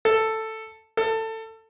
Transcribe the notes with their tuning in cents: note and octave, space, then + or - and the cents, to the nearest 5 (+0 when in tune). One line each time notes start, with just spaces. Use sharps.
A4 +5
A4 +20